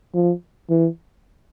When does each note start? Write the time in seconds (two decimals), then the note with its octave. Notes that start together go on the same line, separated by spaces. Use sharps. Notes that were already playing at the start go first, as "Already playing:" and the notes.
0.15 F3
0.70 E3